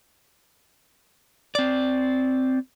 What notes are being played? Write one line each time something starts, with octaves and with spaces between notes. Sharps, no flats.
C4 D5